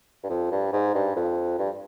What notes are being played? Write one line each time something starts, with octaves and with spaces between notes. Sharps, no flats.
G2
F2
G2
G#2
G2
F2
G2